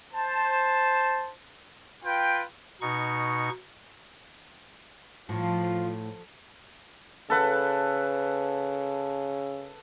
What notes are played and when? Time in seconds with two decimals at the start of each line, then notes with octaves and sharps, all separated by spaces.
0.14 C5 A5
2.05 F4 B4 G5
2.81 B2 D#4 C#6
5.29 A2 F3 F4
7.30 C#3 A4 B4 F#5